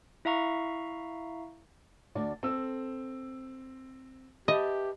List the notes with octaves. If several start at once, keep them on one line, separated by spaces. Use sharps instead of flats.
E4 E5 F5 A#5 C#6
D2 D4 D5
C4 A4 E6
G4 B4 D#5 E5 A5